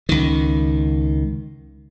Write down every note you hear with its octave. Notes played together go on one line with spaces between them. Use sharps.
C#2 D#3